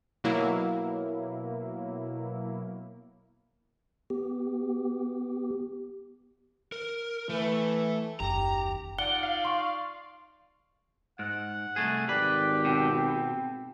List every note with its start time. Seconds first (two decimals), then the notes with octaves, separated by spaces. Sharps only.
0.24 B2 F#3 A#3 E4
4.10 B3 G4
6.72 A#4
7.30 E3 A3
8.20 F#1 D#2 G4 A#5
8.98 D#4 F4 D5 F#5 G7
9.23 F5
9.45 C6 C#6
11.19 G#2 F#5
11.76 C2 A3 G#4
12.09 G#1 G4 B4 D5
12.65 B2 C4